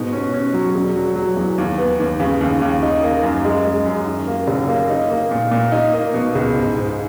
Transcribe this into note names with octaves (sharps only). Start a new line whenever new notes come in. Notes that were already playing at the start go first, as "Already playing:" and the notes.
Already playing: G#2 B2
C#4
C#4
F#3
E1
F#3
F#3
E2
D#2
B3
D#2
C#3
D#2
D#2
D#4
A#3
F#2
G#3
G#3
F#2
D#3
A#3
F#1
A#3
D#4
A#3
A#2
A#2
D#4
A#3
B2
C#2
G#2
G#2